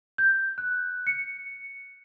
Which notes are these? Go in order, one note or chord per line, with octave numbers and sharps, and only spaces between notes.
G6
F#6
C#7